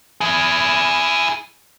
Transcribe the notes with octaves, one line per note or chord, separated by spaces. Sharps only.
E4 G#4